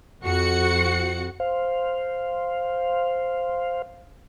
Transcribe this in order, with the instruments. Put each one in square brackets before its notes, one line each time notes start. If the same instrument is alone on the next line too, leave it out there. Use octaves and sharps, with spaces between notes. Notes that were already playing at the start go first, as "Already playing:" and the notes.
[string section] F2 F#4 F#5 C#7
[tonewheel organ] C5 F5